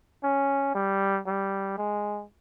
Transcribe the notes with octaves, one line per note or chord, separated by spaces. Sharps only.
C#4
G3
G3
G#3